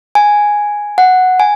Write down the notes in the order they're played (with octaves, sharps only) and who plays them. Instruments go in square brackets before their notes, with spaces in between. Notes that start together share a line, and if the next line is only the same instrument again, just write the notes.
[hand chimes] G#5
F#5
G#5